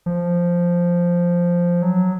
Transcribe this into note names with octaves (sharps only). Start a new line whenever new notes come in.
F3
F#3